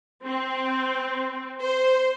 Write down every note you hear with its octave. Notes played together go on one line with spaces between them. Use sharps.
C4
C5